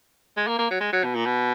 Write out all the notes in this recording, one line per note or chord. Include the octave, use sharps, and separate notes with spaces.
G#3
A#3
A#3
F#3
G#3
F#3
B2
A#2
B2